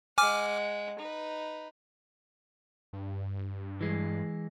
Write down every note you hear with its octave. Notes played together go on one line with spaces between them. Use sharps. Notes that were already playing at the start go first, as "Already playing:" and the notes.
G#3 F#5 G#5 D6 F6
D#4 B4
G2
E3 G#3